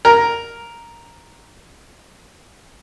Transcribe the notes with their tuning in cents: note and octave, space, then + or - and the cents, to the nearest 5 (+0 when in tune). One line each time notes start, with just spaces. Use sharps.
A#4 +0